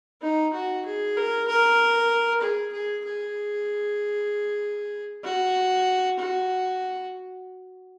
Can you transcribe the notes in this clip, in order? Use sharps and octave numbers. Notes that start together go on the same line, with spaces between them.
D#4
F#4
G#4
A#4
A#4
G#4
G#4
G#4
F#4
F#4